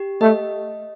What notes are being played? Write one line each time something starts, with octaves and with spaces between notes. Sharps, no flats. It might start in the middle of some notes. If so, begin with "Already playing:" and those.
Already playing: G4
A3 D#5